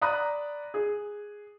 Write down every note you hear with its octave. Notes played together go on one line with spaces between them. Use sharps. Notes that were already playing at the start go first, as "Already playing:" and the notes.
D5 A#5 B5 D#6 F#6
G#4